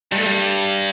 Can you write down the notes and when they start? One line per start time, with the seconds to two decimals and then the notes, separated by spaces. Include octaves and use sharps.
0.12 G2 G3
0.19 A3
0.26 G3